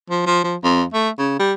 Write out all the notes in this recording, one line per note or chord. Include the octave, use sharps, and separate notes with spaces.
F3
F3
F3
F2
A3
C#3
G3